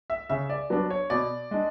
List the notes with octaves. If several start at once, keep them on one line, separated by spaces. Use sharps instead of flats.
E5
C#3 E5
D5
F#3 B3 D4
C#5
B2 D5
G#3 D4